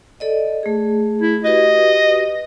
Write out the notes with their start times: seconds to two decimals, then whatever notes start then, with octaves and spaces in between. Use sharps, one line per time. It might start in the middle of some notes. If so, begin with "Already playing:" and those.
0.20 A4 D5 D#5
0.63 A3 G#4
1.22 E4
1.44 F#4 G4 B4 D#5